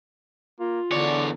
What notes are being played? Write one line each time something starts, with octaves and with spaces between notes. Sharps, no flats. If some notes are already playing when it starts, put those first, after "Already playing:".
A#3 F4
E2 D3 C#5 D5